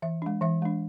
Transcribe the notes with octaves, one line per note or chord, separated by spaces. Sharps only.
E3 E5
G#3 D4
E3 E5
G#3 D4